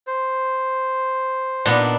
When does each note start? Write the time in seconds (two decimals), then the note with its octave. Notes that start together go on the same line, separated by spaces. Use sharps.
0.07 C5
1.66 A#2 B3 D4 D#4